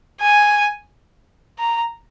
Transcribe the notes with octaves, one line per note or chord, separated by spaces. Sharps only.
G#5
A#5